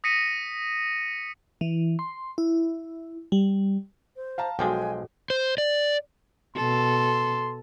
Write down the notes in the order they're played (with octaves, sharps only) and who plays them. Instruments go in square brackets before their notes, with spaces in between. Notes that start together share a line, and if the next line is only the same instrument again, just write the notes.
[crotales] D#6 A#6 B6 C#7 D#7
[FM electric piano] E3
C6
E4
G3
[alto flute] C5
[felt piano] F5 A5 A#5
[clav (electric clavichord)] B1 F3 G#3 [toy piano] F#4 A4 D6 [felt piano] G5 [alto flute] G#5
[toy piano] C#5 F#5
[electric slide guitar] C5
D5
[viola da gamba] B2 A4 [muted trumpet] C6